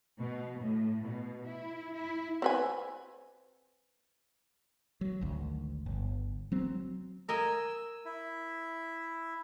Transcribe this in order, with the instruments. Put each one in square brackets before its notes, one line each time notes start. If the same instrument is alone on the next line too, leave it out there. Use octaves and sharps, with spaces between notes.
[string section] B2
A2
B2
E4
E4
[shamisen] C4 B4 G#5
[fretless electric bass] F#3
G#1 D2
G1
F#3 C4
[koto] A#4 D#5 G#5 [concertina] E6
[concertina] E4